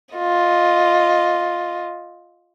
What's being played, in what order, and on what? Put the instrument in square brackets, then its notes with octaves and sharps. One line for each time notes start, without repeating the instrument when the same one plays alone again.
[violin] F4 D#5